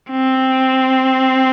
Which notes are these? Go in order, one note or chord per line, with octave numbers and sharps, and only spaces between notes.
C4